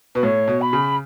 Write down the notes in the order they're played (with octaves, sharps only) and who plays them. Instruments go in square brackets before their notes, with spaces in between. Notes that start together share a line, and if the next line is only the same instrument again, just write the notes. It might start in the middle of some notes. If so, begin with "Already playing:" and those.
[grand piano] B2 [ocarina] B4
[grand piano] A2 [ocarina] C#5
[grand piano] B2
[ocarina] B5
[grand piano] C#3